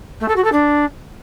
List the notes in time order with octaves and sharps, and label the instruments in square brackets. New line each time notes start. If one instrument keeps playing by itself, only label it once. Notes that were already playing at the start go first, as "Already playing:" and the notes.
[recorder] A3
A4
F#4
A4
D4